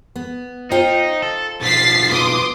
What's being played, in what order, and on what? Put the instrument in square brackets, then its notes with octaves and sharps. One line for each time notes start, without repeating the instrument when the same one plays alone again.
[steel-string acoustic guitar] B3
[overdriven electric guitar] D#4 [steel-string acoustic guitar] F4 C5 G5
[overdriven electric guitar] A4
[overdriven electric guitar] B1 F3 [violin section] A6 B6 C7
[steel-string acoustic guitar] B3 B4 [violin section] C6 D6 D#6